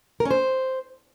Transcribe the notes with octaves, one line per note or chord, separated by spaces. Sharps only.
A#4
C#4
C5